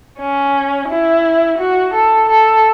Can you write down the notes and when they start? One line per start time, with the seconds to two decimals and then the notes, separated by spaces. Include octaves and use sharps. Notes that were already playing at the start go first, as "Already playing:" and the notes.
0.19 C#4
0.89 E4
1.58 F#4
1.94 A4
2.29 A4